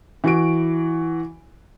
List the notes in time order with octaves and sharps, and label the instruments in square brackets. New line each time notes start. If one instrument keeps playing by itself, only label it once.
[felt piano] E3 F#4 D7